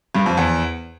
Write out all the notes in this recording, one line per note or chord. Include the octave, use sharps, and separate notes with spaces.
G2
F2
E2